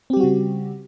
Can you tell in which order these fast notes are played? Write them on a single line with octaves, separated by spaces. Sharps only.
C4 G4 G3 F#4 C#3